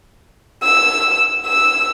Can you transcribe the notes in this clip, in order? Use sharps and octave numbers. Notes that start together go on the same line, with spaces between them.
E6
E6